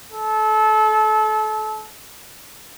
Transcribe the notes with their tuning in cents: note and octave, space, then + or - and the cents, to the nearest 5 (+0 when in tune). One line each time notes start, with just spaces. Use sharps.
A4 -30